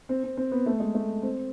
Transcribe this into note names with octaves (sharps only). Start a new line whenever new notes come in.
C4
C4
C4
B3
A3
G#3
A3
C4